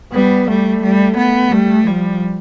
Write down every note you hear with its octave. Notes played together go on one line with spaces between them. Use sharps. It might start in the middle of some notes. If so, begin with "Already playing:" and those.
G3 B3
G3 A3
G3
B3
G3 A3
F3 G3